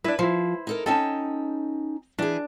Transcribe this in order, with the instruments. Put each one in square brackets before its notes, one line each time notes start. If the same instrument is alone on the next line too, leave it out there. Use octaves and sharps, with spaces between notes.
[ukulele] D4 E4 [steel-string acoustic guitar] B4
[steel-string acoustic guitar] F3 [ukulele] E4 C5
[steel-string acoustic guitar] D#4 A4 A#4
[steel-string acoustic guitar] C#4 D#4 G5 [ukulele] A4 A5
[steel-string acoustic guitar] E3 G#4 [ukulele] D4